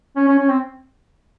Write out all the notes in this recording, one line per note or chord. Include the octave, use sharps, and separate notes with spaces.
C#4
C#4
C#4
C4